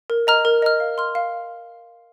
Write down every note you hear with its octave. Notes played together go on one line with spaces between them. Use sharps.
A#4
D#5 A#5 F6
A#4
D#5 A#5 F6
F5
C6 F6
F5